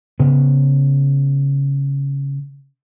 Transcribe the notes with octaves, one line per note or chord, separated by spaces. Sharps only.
C#3 B3